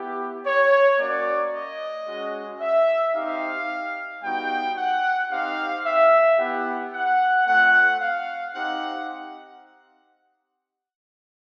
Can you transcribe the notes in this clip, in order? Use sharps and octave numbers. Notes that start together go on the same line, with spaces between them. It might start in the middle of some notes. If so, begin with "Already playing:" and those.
Already playing: B3 E4 G4
C#5
A#3 C#4 F#4 D5
D#5
G#3 C#4 F#4
E5
C4 D#4 G4 F5
G3 B3 D#4 F#4 G5
F#5
C4 D#4 G4 F5
E5
B3 E4 G4 F#5
F#5
A3 C4 F4 F#5
F5
C4 D#4 G4 F#5